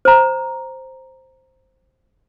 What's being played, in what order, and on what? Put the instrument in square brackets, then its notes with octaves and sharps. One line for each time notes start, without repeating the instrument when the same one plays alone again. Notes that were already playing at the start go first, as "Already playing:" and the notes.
[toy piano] C5 A#5